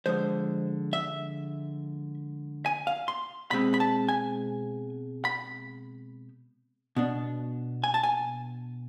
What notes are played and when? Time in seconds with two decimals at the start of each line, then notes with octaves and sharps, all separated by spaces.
0.06 D3 F3 G#3 C5
0.93 E5
2.66 G#5
2.87 F5
3.08 C6
3.51 B2 G#3 C4 B5
3.74 B5
3.80 A5
4.09 G#5
5.25 B5
6.96 B2 B3 D4
7.84 G#5
7.94 A5
8.03 G#5